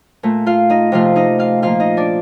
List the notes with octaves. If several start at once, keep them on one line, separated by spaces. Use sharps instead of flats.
A#2 A3
F4 F5
D#4 D#5
C3 F3 A3 F4 F5
D#4 D#5
F4 F5
A#2 F3 A#3 F4 F5
D#4 D#5
D4 D5